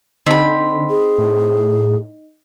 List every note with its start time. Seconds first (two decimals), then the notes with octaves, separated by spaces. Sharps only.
0.26 D3 C4 D#4 D#5 B5 B6
0.90 G#4
1.18 A2